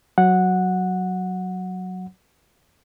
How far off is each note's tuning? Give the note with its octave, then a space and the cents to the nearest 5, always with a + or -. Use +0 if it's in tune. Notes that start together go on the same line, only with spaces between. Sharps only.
F#3 +0 F#5 -10